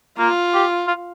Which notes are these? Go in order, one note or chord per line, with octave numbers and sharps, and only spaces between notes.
A#3 F4
G4
F4